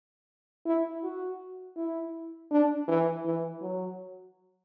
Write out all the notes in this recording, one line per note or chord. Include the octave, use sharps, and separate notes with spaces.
E4
F#4
E4
D4
E3
E3
F#3